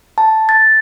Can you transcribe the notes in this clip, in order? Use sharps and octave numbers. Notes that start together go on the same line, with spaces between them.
A5
A6